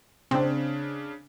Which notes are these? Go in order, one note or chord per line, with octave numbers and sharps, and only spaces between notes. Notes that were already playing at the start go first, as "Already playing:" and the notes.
C#3 C4 D4